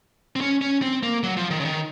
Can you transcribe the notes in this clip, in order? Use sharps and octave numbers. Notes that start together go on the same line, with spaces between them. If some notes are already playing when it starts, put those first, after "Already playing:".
C4
C#4
C#4
C4
A#3
F#3
F3
D#3
C#3
D#3